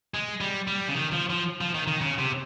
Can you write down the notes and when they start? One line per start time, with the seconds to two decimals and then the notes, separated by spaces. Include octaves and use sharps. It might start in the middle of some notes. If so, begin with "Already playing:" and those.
0.14 G#3
0.41 G3
0.67 G3
0.88 C#3
0.95 D#3
1.12 F3
1.30 F3
1.61 F3
1.75 D#3
1.87 D#3
2.01 C#3
2.18 C3